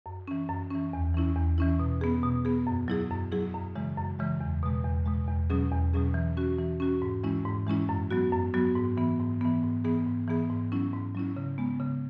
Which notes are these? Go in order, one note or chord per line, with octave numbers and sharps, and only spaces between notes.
F#2
E3 C#4
F#2
E3 C#4
E2
E3 C#4 E4
E2
E3 C#4 E4
B2
B3 G#4
B2
B3 G#4
F#2
F#3 E4 G#4
F#2
F#3 E4 G#4
F#2
C#3 E3 G#3
F#2
C#3 E3 G#3
E2
B2 G#3
E2
B2 G#3
E2
B2 F#3 C#4 G#4
E2
B2 F#3 C#4 G#4
E3
C#4 F#4
E3
C#4 F#4
G#2
E3 G#3 C#4 E4
G#2
E3 G#3 C#4 E4
F#2
F#3 B3 F#4
F#2
F#3 B3 F#4
G#2
E3 B3
G#2
E3 B3
G#2
E3 B3 G#4
G#2
E3 B3 G#4
G#2
F#3 C#4 E4
G#2
F#3 C#4 E4
C#3
G#3 B3
C#3